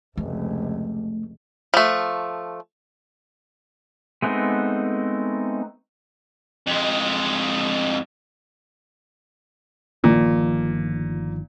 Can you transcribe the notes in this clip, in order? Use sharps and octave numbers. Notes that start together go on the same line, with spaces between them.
F1 C#2 A3
F3 A3
G#3 A3 B3 C4 D#4
F2 G#3
G1 A#2 D#3 F3